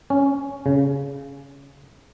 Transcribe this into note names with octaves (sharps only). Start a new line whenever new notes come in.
C#4
C#3